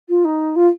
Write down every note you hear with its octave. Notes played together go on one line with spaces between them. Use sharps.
F4
D#4
F4